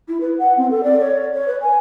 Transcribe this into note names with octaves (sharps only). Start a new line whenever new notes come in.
E4
B4
F#5
C4
A4
D5
C#5
C#5
B4
G#5